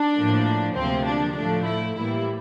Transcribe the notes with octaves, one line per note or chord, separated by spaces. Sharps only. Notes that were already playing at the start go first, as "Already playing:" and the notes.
Already playing: D4
A2 F3 A#3
D2 C3 F3 A#3 C4
D4
A2 F3 A3 D4
E4
A2 E3 G3 A#3 E4